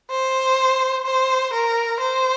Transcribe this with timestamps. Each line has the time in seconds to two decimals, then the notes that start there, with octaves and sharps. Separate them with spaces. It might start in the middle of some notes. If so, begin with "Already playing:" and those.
0.11 C5
1.06 C5
1.53 A#4
2.00 C5